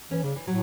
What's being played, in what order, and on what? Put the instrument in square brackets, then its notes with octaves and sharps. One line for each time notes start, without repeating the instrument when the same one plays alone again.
[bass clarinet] E3 [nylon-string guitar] C#4
[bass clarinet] C#3 [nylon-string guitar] D4
[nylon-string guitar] E3
[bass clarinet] A2 [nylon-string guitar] F#3